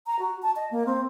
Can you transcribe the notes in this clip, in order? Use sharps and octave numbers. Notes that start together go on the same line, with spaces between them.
A#5
F#4
A5
D#5
A#3
C4